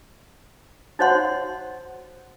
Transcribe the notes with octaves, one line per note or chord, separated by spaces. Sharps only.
D#4 F#4 C5 C#5 F#5 C6